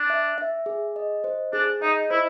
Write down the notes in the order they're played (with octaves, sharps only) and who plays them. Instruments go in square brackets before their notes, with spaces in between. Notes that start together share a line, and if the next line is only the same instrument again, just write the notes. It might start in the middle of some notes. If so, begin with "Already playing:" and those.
Already playing: [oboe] D4
[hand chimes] E5
E5
G#4
D#5
C5
[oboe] D4 [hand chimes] G#4
[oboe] D#4 [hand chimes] D#5
[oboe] E4 [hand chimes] C5